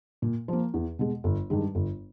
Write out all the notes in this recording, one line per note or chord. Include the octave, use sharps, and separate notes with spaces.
A#2
F3 A#3
E2
B2 G#3
G1
G2 D#3 G#3
G1